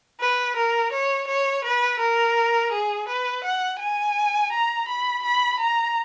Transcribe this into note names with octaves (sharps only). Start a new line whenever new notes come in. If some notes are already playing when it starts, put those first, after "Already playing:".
B4
A#4
C#5
C#5
B4
A#4
G#4
B4
F#5
G#5
A#5
B5
B5
A#5